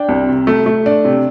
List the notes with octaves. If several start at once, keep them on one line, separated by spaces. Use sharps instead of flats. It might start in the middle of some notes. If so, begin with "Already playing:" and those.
Already playing: D4 G5
C2
C3
A3
A3
D4
C3